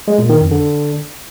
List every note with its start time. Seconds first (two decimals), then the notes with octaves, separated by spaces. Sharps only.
0.08 G#3
0.18 A#2
0.29 D#3
0.40 F2
0.51 D3